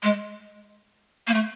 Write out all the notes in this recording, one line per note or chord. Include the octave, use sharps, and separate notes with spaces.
G#3
A#3
A3